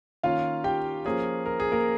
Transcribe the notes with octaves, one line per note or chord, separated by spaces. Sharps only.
D#3 A#3 C#4 F4 F5
G4 G5
F3 A#3 C#4 G#4
A#4
G#4
A#3 A#4